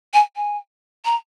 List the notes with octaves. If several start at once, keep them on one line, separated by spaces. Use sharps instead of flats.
G#5
G#5
A#5